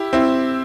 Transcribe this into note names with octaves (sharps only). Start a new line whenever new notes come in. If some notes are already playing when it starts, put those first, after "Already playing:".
Already playing: E4 G4
C4 E4